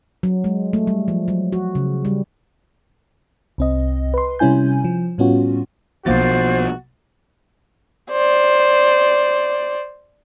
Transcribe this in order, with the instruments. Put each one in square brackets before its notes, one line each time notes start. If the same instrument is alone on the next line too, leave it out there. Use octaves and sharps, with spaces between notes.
[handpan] F#3
G#3
A3
G3
F3
F#3
F#4
C#3
G3
[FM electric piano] C2 C4 D#5
B4 C6
C3 G3 C#4 E4 G#5 G6
F3
A2 G3 B3 C#4 F4 F#4
[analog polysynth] B1 A#3 A6 [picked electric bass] B2 F3 [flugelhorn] F#4 [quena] C5
[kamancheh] C5 D5